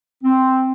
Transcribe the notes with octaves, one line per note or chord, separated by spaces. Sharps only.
C4